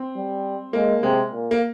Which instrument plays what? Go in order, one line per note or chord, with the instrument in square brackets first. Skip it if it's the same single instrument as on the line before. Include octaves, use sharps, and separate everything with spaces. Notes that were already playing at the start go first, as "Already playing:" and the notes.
Already playing: [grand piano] C4
[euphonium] G3
[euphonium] G#3 [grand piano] A#3
[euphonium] C3 [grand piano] G#3
[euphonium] A#2
[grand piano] A#3